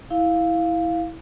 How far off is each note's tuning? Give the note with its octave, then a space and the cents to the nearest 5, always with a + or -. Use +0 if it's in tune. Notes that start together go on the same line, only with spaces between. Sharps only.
E4 -10 F5 +0